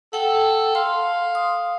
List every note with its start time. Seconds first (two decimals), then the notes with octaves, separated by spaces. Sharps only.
0.13 A4 F#5 G5
0.75 F5 C6
1.35 D#6